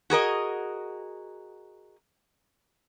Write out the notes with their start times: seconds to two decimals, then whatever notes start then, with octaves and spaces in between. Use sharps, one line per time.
0.10 F#4 G#4 A#4 D#5